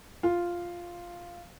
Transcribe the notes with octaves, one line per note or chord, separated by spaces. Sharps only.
F4